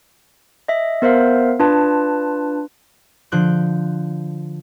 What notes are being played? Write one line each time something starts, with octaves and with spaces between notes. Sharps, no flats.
D#5 E5
B3 A#4 C5 E5 F5
D4 F4 B4 A5
D3 F3 F#6 G6 D7